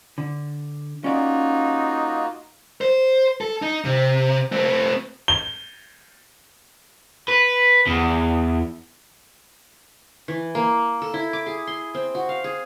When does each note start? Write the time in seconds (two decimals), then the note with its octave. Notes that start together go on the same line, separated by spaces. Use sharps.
0.18 D3
1.04 A#3 C#4 D#4 F4 F#4 D5
2.81 C5
3.41 A4
3.62 D#4
3.84 C3
4.52 A3 C4
5.28 G7
7.28 B4
7.87 E2
10.28 E3
10.55 A#3
11.02 A4
11.14 E4
11.33 D6
11.46 G#4
11.67 C6
11.94 C4
12.15 F#4
12.29 F5
12.44 G#4